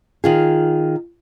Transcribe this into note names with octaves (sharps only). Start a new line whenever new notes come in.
D#3 F4 G#4